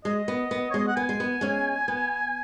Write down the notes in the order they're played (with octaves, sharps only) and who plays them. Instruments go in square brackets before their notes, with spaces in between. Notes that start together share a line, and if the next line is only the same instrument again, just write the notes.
[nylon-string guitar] G#3 [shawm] D#5
[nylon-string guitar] B3
B3
[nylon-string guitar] G#3 [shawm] C#5
[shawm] D#5
F#5
[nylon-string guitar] B3 [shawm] G#5
[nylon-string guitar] G#3
B3
G#3 C#4
B3